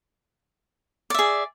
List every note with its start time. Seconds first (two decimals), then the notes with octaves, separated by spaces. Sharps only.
1.10 D5
1.14 E5
1.19 G#4